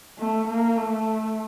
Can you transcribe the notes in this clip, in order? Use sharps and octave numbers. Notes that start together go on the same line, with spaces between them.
A3
A#3
A3